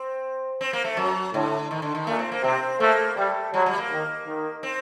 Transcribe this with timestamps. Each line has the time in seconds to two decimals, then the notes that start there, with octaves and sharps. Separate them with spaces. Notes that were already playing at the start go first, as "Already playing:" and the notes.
Already playing: C4
0.61 C4
0.73 A#3
0.85 A3
0.97 F#2 F#3
1.34 A2 D3
1.71 D#3
1.82 D3
1.95 D#3
2.07 A#2 A3
2.19 C4
2.32 A#3
2.43 C3 C4
2.80 A3 A#3
3.17 G3 A3
3.54 F#3 G3
3.66 G3
3.73 A3
3.78 A#3
3.90 D#3
4.26 D#3
4.63 C4